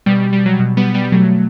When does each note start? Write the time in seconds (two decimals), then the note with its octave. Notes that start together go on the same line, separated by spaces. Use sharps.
0.06 B2 G3
0.20 G3
0.33 G3
0.46 F#3
0.59 B2
0.77 G3 B3
0.94 G3 B3
1.12 B2 F#3 A3